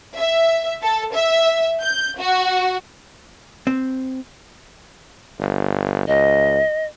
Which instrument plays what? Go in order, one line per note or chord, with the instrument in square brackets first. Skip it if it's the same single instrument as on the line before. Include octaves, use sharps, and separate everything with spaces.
[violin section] E5
A4
E5
G6
F#4
[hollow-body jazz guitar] C4
[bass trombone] G1
[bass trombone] C#2 [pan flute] D#5